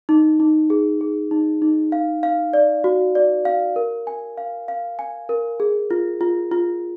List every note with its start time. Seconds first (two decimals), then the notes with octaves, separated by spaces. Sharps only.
0.09 D#4
0.40 D#4
0.70 G#4
1.01 G#4
1.31 D#4
1.62 D#4
1.92 F5
2.23 F5
2.53 D5
2.84 F#4
3.15 D5
3.45 F5
3.76 A#4
4.07 G#5
4.37 F5
4.68 F5
4.99 G#5
5.29 A#4
5.60 G#4
5.91 F4
6.21 F4
6.52 F4